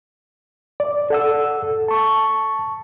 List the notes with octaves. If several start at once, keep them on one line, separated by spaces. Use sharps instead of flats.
D5
A4 F#5 E6
A5 C#6